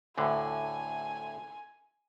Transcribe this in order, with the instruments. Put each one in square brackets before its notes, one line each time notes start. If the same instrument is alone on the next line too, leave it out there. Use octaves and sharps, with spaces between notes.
[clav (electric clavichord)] D2 A2 D3 [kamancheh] G#5